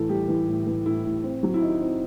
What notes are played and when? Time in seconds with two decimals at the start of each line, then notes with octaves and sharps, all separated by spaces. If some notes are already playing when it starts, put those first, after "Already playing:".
Already playing: A2 E3 A4
0.09 G3 G4
0.28 E3
0.47 A2
0.67 E3
0.85 A2 E4
1.05 A2
1.24 C4
1.43 F#3
1.54 E4
1.62 D#3 D#4
1.81 C4